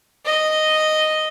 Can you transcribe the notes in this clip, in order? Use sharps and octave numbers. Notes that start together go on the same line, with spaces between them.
D#5